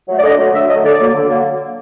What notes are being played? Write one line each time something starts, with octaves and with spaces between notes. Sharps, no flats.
F#3 A3
D5
D3 D#5
F#3 A3
D3 E5
F#3 A3 D#5
D3 D5
F#3 A#3
D3
F#3 A#3